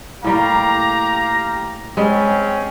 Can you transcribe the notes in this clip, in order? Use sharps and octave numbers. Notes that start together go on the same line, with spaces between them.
A2 G3 A#3 G4 F5 A#5
G3 G#3 C4 C#4